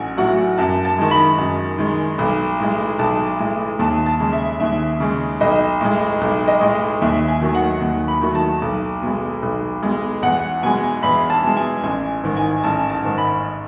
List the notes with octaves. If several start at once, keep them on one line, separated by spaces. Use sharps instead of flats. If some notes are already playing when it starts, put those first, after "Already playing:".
Already playing: A1 F#3 F#5 G#5
A2 F#3 A3 F#5
F#2 A5
A5
D#3 G#3
B5
F#2
D#3 G#3
B1
A2 G#3
B1 A5
A2 G#3
D#2 A5
A5
C#3 G#3
E5
D#2 E5
C#3 G#3
B1 D#5
A2 G#3
B1
D#5
A2 G#3
D#2 E5
G#5
D#3 F#3 A3
F#5
D#2
B5
D#3 F#3 A3
A5
B1
B2 G#3
B1
B2 G#3
E2 F#5
B2 G#3 G#5
E2 B5
A5
B2 G#3
G#5
A1 G#5
G#2 D#3
G#5
A1 A5
A5
G#2 D#3
B5